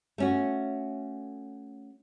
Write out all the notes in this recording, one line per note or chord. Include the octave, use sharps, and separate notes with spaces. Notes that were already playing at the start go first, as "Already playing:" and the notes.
A3 C#4 F#4